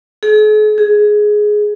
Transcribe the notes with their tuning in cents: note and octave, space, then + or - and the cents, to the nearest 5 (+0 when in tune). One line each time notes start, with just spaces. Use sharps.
G#4 +45
G#4 +10